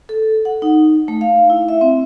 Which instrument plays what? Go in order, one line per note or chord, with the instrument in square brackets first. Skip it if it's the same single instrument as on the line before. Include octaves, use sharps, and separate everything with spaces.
[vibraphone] A4
F#5
D#4
A3
F5
E4
E5
C4